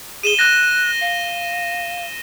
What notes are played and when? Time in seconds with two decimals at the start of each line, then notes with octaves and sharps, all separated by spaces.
0.23 G#4 D#7 E7 G7
0.39 F#6 A#6
1.01 F5